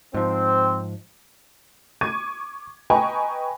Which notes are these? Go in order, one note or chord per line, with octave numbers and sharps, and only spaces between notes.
G#2 F3 C4
C#6 D6 G#6 D#7
B4 D#5 G5 G#5 A#5 C#6